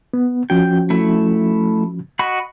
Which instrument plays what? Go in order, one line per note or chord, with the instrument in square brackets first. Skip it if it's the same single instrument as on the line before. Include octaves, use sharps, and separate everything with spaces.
[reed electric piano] B3
[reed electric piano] F3 C#4 F#4 [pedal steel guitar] G5
[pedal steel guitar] A3 E4
F#4 D#5 B5